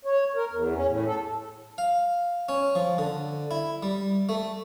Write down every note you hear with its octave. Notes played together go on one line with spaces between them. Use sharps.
C#5
A#4
E2
C#4
A2
A4
F5
C#4
F3
D3
E4
G3
A3